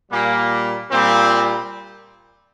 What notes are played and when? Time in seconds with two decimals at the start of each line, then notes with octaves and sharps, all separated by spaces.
0.12 A#2 G3 A#3
0.91 A#2 G3 C4